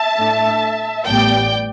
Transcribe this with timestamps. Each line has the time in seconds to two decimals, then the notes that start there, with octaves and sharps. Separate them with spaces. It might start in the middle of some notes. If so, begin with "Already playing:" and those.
Already playing: E5 A5
0.18 A2 A3 D4
1.05 A1 A2 G3 B3 D5 G5